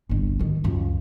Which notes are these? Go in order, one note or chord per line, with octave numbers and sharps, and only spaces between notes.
G1 C2
G#2 D#3
C#2 F#2